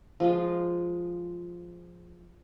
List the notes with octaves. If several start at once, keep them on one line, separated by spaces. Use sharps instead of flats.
F3 G#3 F4